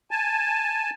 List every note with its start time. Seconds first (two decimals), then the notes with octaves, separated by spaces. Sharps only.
0.11 G#5 A5